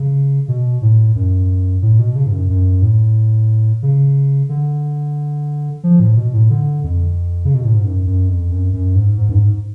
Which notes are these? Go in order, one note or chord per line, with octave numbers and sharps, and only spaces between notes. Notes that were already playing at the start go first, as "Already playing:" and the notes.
Already playing: C#3
B2
A2
F#2
A2
B2
C#3
G#2
F#2
F#2
A2
C#3
D3
F3
A2
B2
A2
D3
F2
C#3
B2
A2
G#2
F#2
F#2
F2
F#2
F#2
G#2
G#2
F#2
G#2